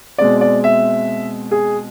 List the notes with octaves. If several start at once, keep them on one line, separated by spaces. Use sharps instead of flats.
B2 G#3 C4 D5
D5
E5
G#4